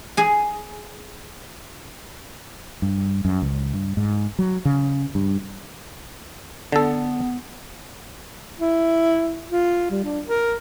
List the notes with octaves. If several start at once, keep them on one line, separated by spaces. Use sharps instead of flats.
G#4 G#5
G2
F#2
C#2
G2
G#2
F#3
C#3
G2
D3 B3 A4
E4
F4
G3
D4
A#4